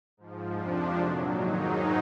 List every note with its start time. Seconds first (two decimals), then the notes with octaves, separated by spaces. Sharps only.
0.17 G#2 F3
0.56 F2 C3 F3 D4
0.96 A#2 F#3
1.35 G#2 D#3 F#3 D#4